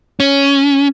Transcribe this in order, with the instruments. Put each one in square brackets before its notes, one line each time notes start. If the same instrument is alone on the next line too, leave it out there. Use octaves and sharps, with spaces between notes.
[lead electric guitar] C#4